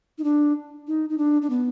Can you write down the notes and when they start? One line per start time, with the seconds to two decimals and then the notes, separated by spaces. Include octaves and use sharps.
0.18 D#4
0.24 D4
0.88 D#4
1.09 D#4
1.18 D4
1.42 D4
1.50 B3